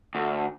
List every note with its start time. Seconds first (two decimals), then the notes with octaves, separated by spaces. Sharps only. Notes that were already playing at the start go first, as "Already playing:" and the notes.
0.15 D2